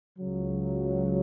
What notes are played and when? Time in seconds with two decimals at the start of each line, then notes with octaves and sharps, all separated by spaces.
0.18 C#2 C#3 F#3